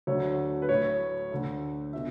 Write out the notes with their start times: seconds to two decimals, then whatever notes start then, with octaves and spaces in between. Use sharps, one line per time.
0.07 D2 D3 F#3 A3 C#5
0.62 B4
0.69 A2 F#3 A3 C#5
1.31 D2 D3 A3
1.93 B2 A3 E5